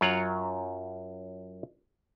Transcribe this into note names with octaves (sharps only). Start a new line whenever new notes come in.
F#2 F#3 F4 C#5 F#5